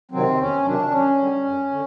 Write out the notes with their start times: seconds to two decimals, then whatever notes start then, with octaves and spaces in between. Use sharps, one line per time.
0.11 C3 D#3 F#3 C4
0.38 E2 C#4
0.65 C3 D#3 F#3 D4
0.91 F#2 C#4
1.18 D3 G3
1.44 F#2
1.71 D3